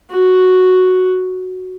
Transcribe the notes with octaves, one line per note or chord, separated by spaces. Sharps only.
F#4